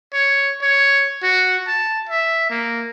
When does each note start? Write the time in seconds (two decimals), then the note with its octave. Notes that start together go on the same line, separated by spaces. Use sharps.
0.14 C#5
0.62 C#5
1.23 F#4
1.68 A5
2.09 E5
2.50 A#3